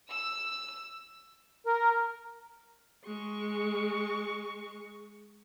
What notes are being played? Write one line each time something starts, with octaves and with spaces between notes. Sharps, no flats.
E6
A#4
G#3 C#6